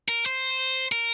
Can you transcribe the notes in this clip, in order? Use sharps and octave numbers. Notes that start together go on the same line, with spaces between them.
A#4
C5
A#4